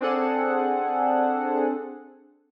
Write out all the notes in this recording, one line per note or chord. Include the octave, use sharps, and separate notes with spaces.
C4 D4 G#4 A4 F#5